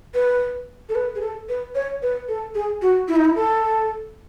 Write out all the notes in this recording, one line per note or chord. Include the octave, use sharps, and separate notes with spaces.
B4
A4
B4
G#4
A4
B4
C#5
B4
A4
G#4
F#4
E4
D#4
E4
A4